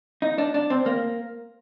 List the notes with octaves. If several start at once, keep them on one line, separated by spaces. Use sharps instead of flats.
D#4
D4
D4
C4
A#3